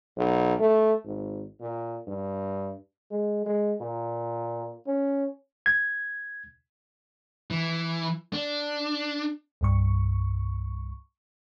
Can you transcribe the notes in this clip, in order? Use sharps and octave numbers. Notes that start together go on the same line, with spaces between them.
B1
A3
G#1
A#2
G2
G#3
G#3
A#2
C#4
G#6
E3
D4
C2 G2 C#6